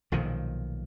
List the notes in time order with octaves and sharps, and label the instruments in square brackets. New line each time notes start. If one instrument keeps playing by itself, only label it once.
[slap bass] B1 A#2 D#3 F3